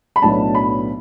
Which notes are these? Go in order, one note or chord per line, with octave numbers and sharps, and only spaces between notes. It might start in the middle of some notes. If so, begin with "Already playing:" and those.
B5
B1 A2 F#3 B3 D4 A5
B5